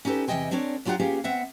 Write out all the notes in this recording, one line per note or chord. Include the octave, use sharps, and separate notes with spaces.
C#4 D#4 G4 A4 B4
E2 C3 F3 D#5 G5 G#5
G#3 C4 D4 A#4 C#5 D5
F#3 D4 F4 G4 F#5 A#5
A#3 B3 C#4 F4 G4 G#4
B3 C4 E5 F#5